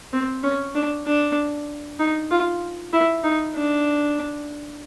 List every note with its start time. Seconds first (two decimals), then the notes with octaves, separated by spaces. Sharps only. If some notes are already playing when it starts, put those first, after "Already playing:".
0.13 C4
0.44 C#4
0.75 D4
1.06 D4
1.99 D#4
2.31 F4
2.93 E4
3.24 D#4
3.55 D4